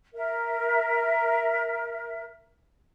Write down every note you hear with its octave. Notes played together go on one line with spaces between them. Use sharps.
A#4 E5